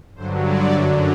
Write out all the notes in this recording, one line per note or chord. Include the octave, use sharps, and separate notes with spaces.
G2 D3 F#3 C5
D5
F#2 D3 F#3 E5